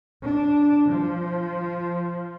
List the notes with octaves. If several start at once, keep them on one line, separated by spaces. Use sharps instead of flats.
D4
F3